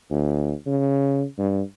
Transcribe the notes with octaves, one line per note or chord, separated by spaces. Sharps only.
D2
C#3
G2